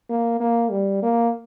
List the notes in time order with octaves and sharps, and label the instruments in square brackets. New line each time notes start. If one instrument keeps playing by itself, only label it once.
[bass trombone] A#3
A#3
G3
A#3